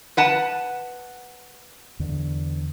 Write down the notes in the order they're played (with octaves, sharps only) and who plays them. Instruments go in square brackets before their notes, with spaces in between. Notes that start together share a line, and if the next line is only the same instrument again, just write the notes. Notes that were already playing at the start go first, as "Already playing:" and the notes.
[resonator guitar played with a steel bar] B4 F#5 A5
[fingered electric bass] E2 D3